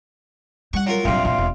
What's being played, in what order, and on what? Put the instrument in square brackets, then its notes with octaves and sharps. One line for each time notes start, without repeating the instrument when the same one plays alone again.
[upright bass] G3 [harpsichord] F#5 C#6
[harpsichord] F#3 F4 A#4
[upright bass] A#1 F#3 [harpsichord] G2 C3 [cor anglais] F4
[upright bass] A#2 E3 [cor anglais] F4
[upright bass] E1